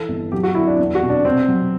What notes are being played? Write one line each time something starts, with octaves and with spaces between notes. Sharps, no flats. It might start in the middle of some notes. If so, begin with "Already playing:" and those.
Already playing: E3 A4
G1
F#3 G4
F#4
D3 E4
D4
E2
F#4
B2
D4
C3 C4
F#3